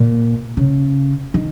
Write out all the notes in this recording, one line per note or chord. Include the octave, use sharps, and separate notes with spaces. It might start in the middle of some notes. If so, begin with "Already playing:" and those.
Already playing: A#2
C#3
D#3